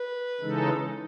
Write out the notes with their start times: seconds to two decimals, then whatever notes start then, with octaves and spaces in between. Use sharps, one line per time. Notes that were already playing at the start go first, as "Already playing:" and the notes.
Already playing: B4
0.41 C#3 E3 G#3 D#4 A4